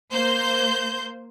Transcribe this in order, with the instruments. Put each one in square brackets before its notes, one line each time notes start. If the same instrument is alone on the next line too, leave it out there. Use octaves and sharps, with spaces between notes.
[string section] A#3 C5 G6